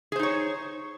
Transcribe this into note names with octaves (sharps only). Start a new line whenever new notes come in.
D#4 G#4 C5 C#5